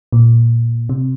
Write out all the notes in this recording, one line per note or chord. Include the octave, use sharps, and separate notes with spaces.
A#2
C3